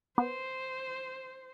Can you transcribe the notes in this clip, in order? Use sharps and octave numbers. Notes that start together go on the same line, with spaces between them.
B3 C5